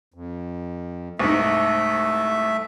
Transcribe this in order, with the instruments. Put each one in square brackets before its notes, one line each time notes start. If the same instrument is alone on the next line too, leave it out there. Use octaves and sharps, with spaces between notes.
[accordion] F2
[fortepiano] C2 G#2 [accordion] A3 E5